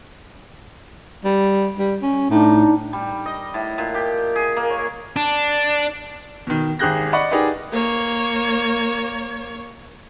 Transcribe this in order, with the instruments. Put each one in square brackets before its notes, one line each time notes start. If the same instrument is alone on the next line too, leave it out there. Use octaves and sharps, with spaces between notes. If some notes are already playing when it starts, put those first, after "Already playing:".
[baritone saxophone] G3
G3
C#4
[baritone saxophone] A2 [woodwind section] D4 D#4
[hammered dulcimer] G3
D#5
A2
A#2
G4
G#4
A#3
C#5
[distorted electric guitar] D4
[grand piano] B2 D#3
G#1 G4 G#4 F#6 G6 A#6
D5 D#5 F#5 B5 C#6
D#4 G4 G#4 A#4 B4 D5
[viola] A#3 C#5